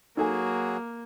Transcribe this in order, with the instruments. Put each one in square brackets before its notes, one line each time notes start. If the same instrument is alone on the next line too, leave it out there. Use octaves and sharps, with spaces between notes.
[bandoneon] F#3 F#4 G#4 [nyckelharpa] A#3 [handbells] D#4 A4 G#5